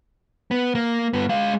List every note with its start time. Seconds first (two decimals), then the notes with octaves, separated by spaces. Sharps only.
0.51 B3
0.75 A#3
1.13 G2 B3
1.29 G#3 F5